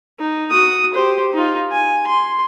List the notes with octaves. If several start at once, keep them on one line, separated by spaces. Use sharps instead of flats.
D#4
F#4 D#6
G4 C5
D#4 F4
G#5
C6